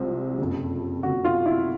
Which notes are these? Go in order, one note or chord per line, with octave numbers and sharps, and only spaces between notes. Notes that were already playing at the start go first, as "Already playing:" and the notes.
Already playing: C2 C3 F3 G#3 C4
F#1 F2 C3
F#1 F2 C3 F#4
F4
E4